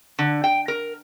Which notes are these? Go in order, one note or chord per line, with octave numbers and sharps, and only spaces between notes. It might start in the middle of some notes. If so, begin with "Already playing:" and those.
D3
G5
A#4